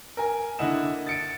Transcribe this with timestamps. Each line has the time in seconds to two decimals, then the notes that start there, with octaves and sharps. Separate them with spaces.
0.17 A#4 G#5
0.59 D3 A#3 E4 D#5 F#5 E7
1.07 A6 C#7 D7